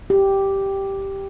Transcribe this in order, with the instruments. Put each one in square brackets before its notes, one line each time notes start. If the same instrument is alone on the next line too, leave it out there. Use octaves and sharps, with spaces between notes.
[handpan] G4